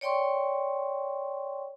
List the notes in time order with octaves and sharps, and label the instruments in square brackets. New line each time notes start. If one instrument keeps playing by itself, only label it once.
[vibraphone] C#5 D5 G5 C6 C#6